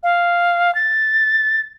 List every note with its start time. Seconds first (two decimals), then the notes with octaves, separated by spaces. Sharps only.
0.03 F5
0.75 A6